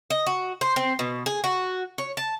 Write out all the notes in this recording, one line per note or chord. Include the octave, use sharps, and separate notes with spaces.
D#5
F#4
C5
C4
B2
G#4
F#4
C#5
A5